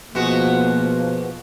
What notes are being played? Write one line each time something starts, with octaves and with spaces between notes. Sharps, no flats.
B2 F3 G#3 A#3 B3 F#4